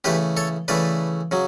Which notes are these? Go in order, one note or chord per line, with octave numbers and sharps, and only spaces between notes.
C#3 E3 A3 G4 B4
A4 C#5
C#3 E3 A3 B4 D5
C#3 F#3